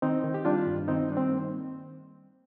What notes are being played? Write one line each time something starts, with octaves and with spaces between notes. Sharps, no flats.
D#3 C4 D#4
D#3
G4
G3 D4 F4
G2
D#3 C4 D#4
G3 D4
C4
A#3